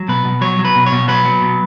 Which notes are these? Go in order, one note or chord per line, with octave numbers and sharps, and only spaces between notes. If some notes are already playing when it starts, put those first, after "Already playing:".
Already playing: F#3
B2 B4
B2
F#3 C#5
F#3
B4
B2
C#5
B2
F#3 B4
F#3
B2